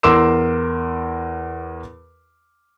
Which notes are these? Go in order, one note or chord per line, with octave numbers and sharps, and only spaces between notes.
E2 A#4 C6 D6 E6 E7